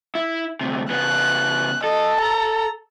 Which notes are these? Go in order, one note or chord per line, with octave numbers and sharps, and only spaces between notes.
E4
D2 C3
C#3 B3 F#6
A4 D#5
A#5